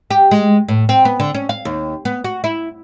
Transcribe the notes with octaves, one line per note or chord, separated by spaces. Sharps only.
G4
G#3
A2
C4
B3
D3
C#4
F5
D#2
B3
F#4
E4